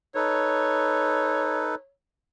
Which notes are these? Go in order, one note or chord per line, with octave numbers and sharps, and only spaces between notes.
D#4 A4 B4 C#5